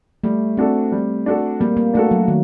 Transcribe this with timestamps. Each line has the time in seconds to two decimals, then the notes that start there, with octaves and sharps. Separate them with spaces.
0.24 G3 A3
0.57 C4 D4 F#4 A4
0.92 G3
1.26 D4 F#4 A4
1.60 G3 A#3
1.77 A#3
1.94 A3 D4 F#4 A4
2.11 F#3
2.28 D#3